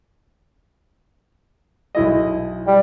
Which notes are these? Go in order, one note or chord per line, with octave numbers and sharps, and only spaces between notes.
B1 E4 D#5
G3